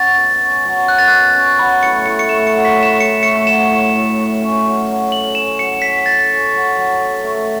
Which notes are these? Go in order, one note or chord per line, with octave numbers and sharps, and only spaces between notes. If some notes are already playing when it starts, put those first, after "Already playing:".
Already playing: F#3 C#4 F#4 A6
B2
C#4
F#3
F#4 F#6
A6
B2 F#6
C#4
F#3 B5
A2 C#7
A2 C#7
C#7
A3 E7
C#7
F#3
B6
A2
E7
A2 C#7
A3 C#7
F#3 E7
A2
A2
A3
C#4
F#3
F#3
A4 F#7
C#4 E7
F#3 C#7
F#3 B6
A4 A6
C#4
F#3
F#3
A4
A3